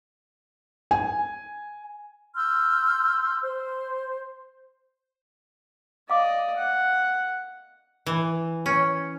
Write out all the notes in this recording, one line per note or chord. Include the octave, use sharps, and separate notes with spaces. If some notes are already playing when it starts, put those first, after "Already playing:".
G#5
C6 E6 F6 G6
C5
D5 D#5 F5 D6
F#5
E3
C#4